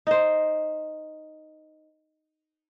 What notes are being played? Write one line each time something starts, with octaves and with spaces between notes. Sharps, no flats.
D#4 C5